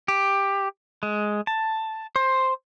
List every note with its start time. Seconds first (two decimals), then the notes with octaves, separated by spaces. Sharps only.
0.08 G4
1.03 G#3
1.47 A5
2.16 C5